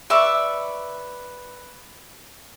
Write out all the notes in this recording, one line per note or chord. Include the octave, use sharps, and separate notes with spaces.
B4 D5 E5 C#6